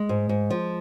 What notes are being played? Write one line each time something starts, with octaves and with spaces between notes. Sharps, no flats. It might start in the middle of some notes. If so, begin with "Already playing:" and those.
Already playing: G#3
G#2
G#2
F3